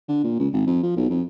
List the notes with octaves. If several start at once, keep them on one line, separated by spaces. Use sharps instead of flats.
D3
A#2
C#2
G#1
F2
F3
B1
F2